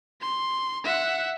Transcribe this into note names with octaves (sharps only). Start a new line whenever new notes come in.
C6
E5 F#5